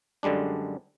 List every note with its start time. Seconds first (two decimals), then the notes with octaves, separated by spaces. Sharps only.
0.23 F#2 D3 G3 G#3 D4